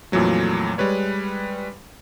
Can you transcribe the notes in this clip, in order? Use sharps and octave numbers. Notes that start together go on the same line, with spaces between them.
F2 A#2 E3 F#3 A3
G3 G#3 B4 C#5